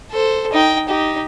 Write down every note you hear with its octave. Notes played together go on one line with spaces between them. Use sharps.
A4 C5
D#4 G5
D#4 G4